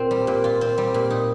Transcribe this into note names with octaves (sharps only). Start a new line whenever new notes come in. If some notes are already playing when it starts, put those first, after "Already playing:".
Already playing: A#2 C4 F4
G3
A#2
F4
C4
G3
A#2
D#4